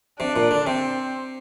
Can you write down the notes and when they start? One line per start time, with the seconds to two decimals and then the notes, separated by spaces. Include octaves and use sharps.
0.20 C3 D4
0.36 A#2
0.51 D3
0.66 C3 C4